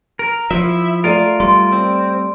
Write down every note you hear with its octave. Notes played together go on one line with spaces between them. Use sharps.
A#4
F3 E4 E5
A3 F4 A#4 D5 D7 D#7
G3 C6
C4